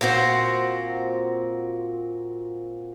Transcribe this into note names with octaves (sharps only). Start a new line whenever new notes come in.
A#2 C4 F#4 C5